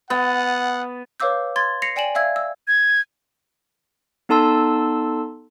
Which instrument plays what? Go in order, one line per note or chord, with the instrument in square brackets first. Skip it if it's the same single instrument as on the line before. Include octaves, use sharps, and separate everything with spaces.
[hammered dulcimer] B3 [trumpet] F#5
[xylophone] B4 C#5 F5 D6 E6 G6
C6 G#6 A6
A#6 C7 C#7 F7
D5 G5 G#5 E7 F#7
D5 E5 F5 E6 G#6
E6
[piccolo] G#6
[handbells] B3 D#4 A4 A5 C6 E6